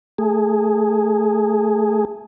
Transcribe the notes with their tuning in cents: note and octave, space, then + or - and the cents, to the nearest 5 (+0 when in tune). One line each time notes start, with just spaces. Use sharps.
A3 +0 G#4 +0